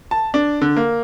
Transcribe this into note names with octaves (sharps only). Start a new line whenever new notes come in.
A5
D4
D3
A#3